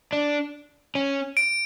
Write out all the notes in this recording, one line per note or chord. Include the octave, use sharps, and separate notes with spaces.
D4
C#4
D7